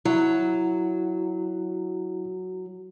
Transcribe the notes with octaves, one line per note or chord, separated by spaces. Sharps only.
F#3 E4